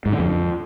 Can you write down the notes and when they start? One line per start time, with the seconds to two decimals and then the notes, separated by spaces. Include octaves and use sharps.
0.06 G#2
0.12 D3
0.19 F2